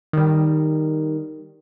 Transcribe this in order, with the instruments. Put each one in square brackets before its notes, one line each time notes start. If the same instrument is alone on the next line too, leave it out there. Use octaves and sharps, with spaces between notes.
[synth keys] D#3 G3